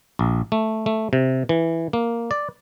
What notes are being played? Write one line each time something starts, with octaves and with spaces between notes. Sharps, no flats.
A#1
A3
A3
C3
E3
A#3
D5